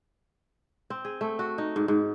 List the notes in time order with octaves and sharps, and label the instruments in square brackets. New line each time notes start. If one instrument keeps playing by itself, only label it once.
[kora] C4
G#4
A3
F#4
D#4
G#2
G#2